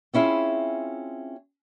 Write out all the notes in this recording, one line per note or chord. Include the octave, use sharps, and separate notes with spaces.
C4 C#4 E4 F4 G#4